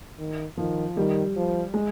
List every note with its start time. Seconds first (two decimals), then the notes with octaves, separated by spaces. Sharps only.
0.19 D#3
0.57 D#3 F3
0.96 D#3 G3
1.36 F3
1.74 G#3